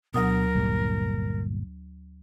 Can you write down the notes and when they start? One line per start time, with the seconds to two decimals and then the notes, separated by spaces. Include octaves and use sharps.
0.14 D2 B2 F#3 A#4 D#6
0.55 G1 A#2 G3